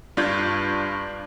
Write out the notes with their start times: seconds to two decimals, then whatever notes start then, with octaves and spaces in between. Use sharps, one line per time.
0.17 G2 D4 F4 G6 G#6